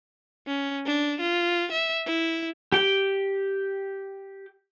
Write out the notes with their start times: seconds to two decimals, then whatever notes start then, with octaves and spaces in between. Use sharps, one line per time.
0.47 C#4
0.87 D4
1.21 F4
1.72 E5
2.06 E4
2.72 G4 G5